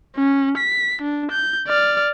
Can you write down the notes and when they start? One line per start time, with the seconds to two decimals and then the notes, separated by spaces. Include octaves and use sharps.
0.16 C#4
0.57 B6
1.02 D4
1.32 G6
1.68 D5 F6